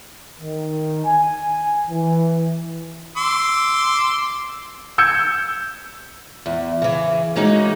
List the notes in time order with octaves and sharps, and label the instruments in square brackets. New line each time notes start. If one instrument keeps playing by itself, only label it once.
[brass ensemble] D#3
G#5
E3
[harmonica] C6 D6 E6
[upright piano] E6 G6 G#6 C#7
[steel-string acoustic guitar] E2
C#3 E3
E3 G#3 A#3 C#4 D#4 F#4